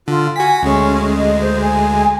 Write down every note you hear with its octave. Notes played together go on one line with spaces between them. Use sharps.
D3 F4
F#4 G#5 B6
D2 G#3 C#4
D#5
C5
G#5